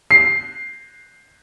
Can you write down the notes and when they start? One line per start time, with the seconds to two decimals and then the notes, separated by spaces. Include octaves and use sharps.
0.11 C7